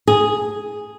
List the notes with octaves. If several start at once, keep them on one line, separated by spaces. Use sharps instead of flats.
G#4